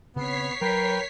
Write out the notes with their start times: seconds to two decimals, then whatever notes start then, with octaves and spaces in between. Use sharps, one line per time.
0.16 C#3 B3 C4 C#5 B6 C7
0.61 F#3 A#4 B4 G5